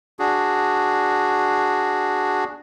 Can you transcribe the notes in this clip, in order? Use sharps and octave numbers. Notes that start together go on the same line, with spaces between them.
D4 F#4 G#4